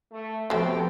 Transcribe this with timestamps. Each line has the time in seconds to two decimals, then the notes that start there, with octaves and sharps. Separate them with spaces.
0.12 A3
0.50 C3 F3 F#3 A3 B3 G5